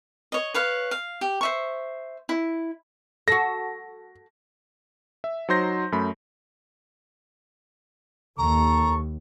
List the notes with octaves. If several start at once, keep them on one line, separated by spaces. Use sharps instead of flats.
C#5 D#5
B4 C#5 F5
F5
G4
C5 E5 C#6
E4
F#4 A4 A#6
E5
F#3 D#4 C5 C6 G6 A#6
F#2 A3 B5
D#2 A4 A#5 C#6